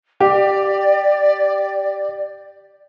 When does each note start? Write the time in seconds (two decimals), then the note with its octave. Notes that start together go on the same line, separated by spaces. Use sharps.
0.20 G4 D5